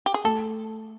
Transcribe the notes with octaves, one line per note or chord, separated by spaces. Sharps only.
G4
G#4
A3 A4